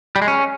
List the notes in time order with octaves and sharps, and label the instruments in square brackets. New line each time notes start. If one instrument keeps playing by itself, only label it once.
[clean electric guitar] G3
G#3
C#4